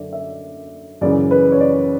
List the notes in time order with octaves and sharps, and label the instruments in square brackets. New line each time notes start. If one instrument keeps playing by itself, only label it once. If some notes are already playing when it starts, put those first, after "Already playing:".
Already playing: [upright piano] F#2 D3 D5 E5
E5
F#2 C#3 E3 D5
B4
C#5
D5